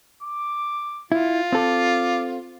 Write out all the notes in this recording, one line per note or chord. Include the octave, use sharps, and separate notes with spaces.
D6
E4 F4
C4 A4 D6